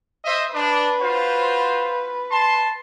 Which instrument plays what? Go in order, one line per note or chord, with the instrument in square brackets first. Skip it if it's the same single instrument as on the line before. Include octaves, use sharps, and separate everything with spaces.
[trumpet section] C5 D#5 E5
[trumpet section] D4 [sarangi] B4
[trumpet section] F4 F#4 C5
A5 C6